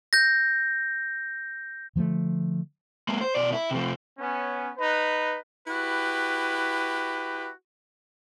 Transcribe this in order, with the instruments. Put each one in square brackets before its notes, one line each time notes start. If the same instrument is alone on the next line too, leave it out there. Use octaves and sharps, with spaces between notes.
[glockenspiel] G6 A#6
[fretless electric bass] D3 F3 G3 A3
[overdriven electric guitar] G#3 A#3
C5
B2 D5
E4
C3 F3
[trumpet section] B3 C#4
D#4 B4
[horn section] E4 F#4 G4 B4